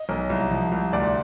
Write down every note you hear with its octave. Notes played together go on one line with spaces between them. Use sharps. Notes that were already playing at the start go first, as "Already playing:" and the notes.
Already playing: D#5
B1
C2
F3
C2
D2 D5